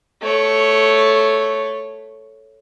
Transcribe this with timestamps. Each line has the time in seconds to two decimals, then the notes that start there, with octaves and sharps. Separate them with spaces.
0.22 A3 C#5